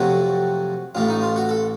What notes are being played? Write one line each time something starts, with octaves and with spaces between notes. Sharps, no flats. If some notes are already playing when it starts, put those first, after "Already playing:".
Already playing: F2 C3 F#3 A3 F#4
A1 A2 A3 F4
D#4
F4
F#4
A4